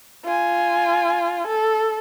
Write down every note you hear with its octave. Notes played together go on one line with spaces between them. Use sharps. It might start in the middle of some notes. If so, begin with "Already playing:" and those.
F4 G#5
A4